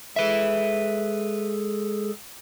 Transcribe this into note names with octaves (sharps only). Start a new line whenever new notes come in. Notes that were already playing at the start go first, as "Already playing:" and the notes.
G#3 G#4 A4 B4 E5